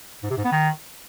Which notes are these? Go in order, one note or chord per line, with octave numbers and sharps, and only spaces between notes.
G#2
C3
G#2
B3
D#3